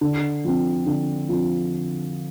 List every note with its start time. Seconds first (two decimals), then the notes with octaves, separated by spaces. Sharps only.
0.01 D3
0.44 F3 C4
0.86 D3
1.29 F3 C4